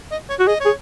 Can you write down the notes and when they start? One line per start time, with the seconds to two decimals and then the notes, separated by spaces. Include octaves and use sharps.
0.12 D#5
0.30 C#5
0.40 F#4
0.47 G#4 D#5
0.60 C#5
0.65 G#4